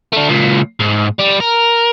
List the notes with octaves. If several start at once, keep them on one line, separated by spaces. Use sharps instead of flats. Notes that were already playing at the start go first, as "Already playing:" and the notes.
A3 D4
C#2 A#2
G#2
G3
A#4